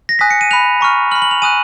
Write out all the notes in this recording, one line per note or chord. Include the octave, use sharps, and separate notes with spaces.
A#6
G#5 D#6 F#6 B6
C#7
D#7
B5 F#6 F7
A#5 C#6 F6
B5 F6 F#7
F#7
F7
G#5 D#6 F#6 D#7